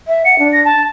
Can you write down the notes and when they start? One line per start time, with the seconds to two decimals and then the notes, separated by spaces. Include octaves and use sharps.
0.08 E5
0.25 F#5 C#7
0.39 D4
0.53 A#6
0.65 A5